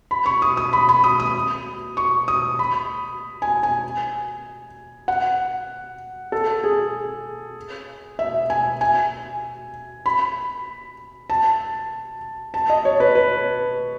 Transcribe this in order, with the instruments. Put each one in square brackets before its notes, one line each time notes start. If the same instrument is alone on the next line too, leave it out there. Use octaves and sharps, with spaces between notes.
[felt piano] B5
C#6
D#6
D#6
B5
B5
D#6
D#6
C#6
D#6
B5
G#5
G#5
F#5
A4
G#4
E5
G#5
G#5
B5
A5
A5
D#5
C#5
B4
B4